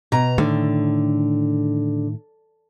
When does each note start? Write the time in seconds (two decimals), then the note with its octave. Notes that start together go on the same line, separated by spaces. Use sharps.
0.12 B2 A#5
0.38 A2 D3 D#3